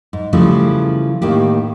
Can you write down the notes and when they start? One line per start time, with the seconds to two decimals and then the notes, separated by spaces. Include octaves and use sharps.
0.13 G#2
0.33 C#3 E3 F3 G3 A3 B3
1.22 A2 D#3 A#3 G4